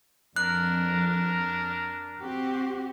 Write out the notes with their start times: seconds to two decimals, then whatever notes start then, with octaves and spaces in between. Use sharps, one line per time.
0.36 F2 D4 A#4 F#6
2.21 C4 F#4 G4